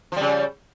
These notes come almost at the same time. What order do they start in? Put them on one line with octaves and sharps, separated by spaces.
F3 G3 C#3